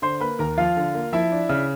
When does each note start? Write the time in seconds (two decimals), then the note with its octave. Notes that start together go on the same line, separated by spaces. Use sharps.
0.02 D3 C5 C6
0.20 A#3 B4 B5
0.39 D#2 A#4 A#5
0.57 F3 F4 F5
0.77 D3
0.94 A#3
1.13 F3 E4 E5
1.32 D4
1.49 C#3